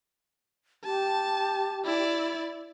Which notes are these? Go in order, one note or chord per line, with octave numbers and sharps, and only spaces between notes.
G4 A5
E4 D5